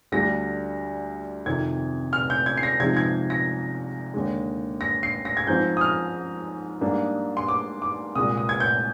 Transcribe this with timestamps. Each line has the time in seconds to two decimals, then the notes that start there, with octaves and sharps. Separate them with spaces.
0.12 D2 D3 G3 D4 A#6
1.46 F2 C3 D#3 G#6
2.13 F6
2.30 G6
2.46 G#6
2.57 C7
2.63 A#6
2.80 C3 F3 G#3 D#4 G#6
2.97 G#6
3.30 A#6
4.14 D#2 D3 G#3
4.81 A#6
5.03 C7
5.25 A#6
5.37 G#6
5.47 G#2 F3 C4 G6
5.77 D#6
5.81 F6
6.81 G#2 G3 A#3 D4
7.37 C6
7.48 D6
7.82 D6
8.15 C2 A#2 G#3 D#6
8.38 D#6
8.49 G#6
8.60 G6